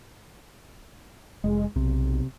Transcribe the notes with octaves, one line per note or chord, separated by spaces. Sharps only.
F1 G#3
B1 C3